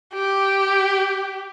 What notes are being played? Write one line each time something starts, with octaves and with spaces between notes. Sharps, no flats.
G4